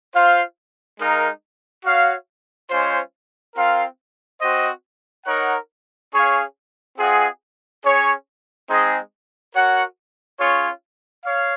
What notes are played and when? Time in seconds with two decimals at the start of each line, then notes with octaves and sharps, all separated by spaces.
0.13 F4 C5 F5
0.98 G#3 D#4 A#4 F5
1.84 F#4 C#5 F5
2.70 G#3 C#4 F4 C5
3.55 C4 F4 A#4 F5
4.41 C4 F#4 C5 D#5
5.26 D#4 A#4 C#5 F#5
6.12 C#4 G#4 C#5 F5
6.97 C4 F4 G#4 D#5 F#5
7.83 C#4 G#4 C#5
8.69 G#3 C4 D#4 G#4 D#5
9.54 F#4 A#4 C#5 F#5
10.40 C#4 F4 G#4 C#5
11.25 C#5 F5